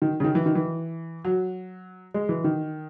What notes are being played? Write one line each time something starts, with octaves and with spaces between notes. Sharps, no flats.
D#3
C#3
D#3
E3
D#3
E3
F#3
G#3
E3
D#3